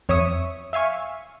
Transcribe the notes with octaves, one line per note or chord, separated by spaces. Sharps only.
F2 C#5 E5 C#6 D#6 C#7
E5 F5 G#5 C#6